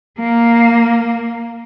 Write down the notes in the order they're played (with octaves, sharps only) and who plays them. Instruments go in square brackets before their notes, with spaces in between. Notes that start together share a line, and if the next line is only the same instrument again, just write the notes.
[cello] A#3